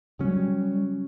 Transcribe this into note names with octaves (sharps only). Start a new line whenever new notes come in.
C#3 F#3 G3 C#4